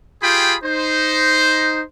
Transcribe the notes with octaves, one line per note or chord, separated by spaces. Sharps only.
F4 G4 G#4 G5 B5
D#4 C5